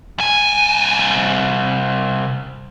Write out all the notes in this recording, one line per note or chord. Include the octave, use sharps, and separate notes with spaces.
C2 G#5